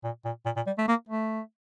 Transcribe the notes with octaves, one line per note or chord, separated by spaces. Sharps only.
A#2
A#2
A#2
A#2
G3
A3
A#3
A3